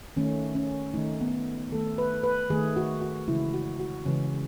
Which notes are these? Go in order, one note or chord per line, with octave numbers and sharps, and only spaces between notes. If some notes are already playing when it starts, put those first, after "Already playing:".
D#3 A3 C#4
C#4
D#3 A3 D#4
B3
D#3 A3 A4
B4
B4
D#3 A3 G#4
F#4
F#4
C#3 E3 G#3 E4
F#4
F#4
C#3 E3 G#3 C#4